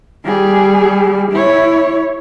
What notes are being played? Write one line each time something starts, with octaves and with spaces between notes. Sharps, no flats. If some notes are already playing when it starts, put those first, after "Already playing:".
G3 G#4
E4 C#5